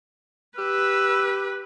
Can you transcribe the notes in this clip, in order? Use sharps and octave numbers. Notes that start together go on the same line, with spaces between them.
G4 B4 E6